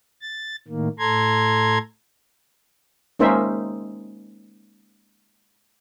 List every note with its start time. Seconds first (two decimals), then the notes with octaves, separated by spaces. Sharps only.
0.22 A6
0.68 A2 D#3 A#3
0.99 A2 A4 A#5 C6 G#6
3.19 G#3 A#3 C#4 D#4 C5 E5